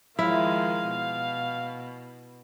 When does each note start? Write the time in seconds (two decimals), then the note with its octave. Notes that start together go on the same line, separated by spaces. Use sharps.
0.19 D#3 F3 G#3 E4 F5
0.87 B2